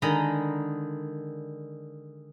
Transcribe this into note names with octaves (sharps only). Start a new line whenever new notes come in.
D3 D#3 G#3 D#5 A#5 B5